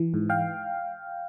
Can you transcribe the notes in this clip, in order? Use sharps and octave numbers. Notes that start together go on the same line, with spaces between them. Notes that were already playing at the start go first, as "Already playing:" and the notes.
Already playing: E3
G#2
F5 G5